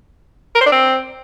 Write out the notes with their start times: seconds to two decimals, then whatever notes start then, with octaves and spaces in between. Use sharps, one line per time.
0.55 A#4
0.61 C5
0.66 D4
0.72 C4